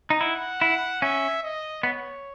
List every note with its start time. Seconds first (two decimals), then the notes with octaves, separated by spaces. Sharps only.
0.10 D#4
0.20 E4 F#5
0.61 E4
1.02 C#4 E5
1.43 D#5
1.83 B3 C#5